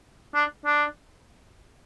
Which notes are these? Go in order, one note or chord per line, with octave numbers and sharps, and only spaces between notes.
D4
D4